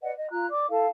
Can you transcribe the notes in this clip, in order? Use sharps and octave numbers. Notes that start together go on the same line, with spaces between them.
B4 D5 D#5 F#5
D#5
F4 A#5 F#6
D5 D6
E4 A4 F5 A5